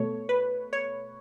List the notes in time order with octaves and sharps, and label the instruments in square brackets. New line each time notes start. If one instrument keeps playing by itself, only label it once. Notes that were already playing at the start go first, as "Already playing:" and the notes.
Already playing: [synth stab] B2 A3 C#5
B4
C#5